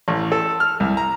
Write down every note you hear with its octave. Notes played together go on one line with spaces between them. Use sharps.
A1
A4
F6
C2
A#5